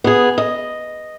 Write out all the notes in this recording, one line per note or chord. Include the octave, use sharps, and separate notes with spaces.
B3 G#4
D#5